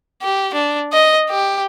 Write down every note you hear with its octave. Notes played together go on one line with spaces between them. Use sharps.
G4
D4
D#5
G4